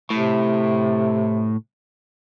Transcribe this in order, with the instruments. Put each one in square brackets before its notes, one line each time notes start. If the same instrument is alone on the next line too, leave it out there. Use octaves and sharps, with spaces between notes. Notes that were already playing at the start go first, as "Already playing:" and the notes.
[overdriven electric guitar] A2 [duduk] C3